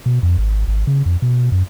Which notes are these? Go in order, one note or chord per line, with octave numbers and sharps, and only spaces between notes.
B2
F2
G#1
G#1
C#3
F2
B2
F#2